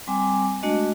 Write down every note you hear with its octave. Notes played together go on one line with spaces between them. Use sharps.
G3 C4 G#5 D6
G#3 A3 D4 F#4 D#5